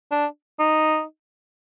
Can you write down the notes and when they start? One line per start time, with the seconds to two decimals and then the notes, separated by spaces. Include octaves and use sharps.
0.11 D4
0.59 D#4